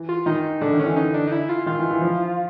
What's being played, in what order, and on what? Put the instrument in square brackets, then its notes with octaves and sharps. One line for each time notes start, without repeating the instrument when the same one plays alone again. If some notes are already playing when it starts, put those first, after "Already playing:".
Already playing: [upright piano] E3
[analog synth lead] F4
[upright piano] D#3 [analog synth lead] D#4
[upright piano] D3 [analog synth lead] D4
[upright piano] D#3
[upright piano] E3 [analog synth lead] C#4
[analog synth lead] D#4
D4
D#4
E4
F4
[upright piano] D#3 [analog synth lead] F4
[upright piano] E3
E3
F3